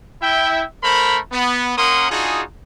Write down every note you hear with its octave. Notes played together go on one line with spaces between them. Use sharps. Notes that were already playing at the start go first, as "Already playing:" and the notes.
E4 E5 G5
A3 A#4 C5 A#5 B5
B3
A#3 C#4 A#4 F#5 C6 D#6
D4 D#4 F4 F#4 G#4